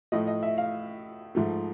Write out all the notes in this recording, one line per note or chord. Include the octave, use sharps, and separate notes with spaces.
A2 F3 A3 D#5
D#5
E5
F5
G#2 F3 A3